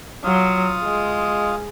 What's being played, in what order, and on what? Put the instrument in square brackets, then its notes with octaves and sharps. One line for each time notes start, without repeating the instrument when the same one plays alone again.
[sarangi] F#3 [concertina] F4 F5 D#6
[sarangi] G#3